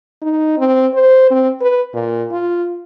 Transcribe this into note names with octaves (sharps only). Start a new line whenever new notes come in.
D#4
C4
C5
C4
B4
A#2
F4